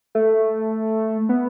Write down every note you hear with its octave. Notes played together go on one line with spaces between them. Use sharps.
A3
B3